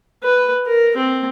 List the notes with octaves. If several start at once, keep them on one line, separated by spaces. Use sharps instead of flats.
B4
A#4
C4